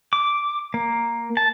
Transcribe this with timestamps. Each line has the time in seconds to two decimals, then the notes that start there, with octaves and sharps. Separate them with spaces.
0.13 D6
0.74 A#3
1.37 A5